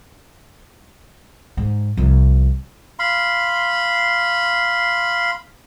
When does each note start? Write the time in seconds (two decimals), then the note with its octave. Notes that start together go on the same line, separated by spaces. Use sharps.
1.57 G#2
1.97 C2 F3
2.99 F5 B5 C6